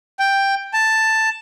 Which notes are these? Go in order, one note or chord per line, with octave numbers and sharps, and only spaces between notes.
G5
A5